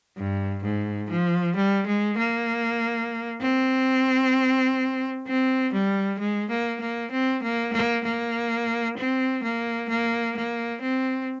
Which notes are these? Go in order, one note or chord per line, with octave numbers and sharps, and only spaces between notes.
G2
G#2
F3
G3
G#3
A#3
C4
C4
G3
G#3
A#3
A#3
C4
A#3
A#3
A#3
C4
A#3
A#3
A#3
C4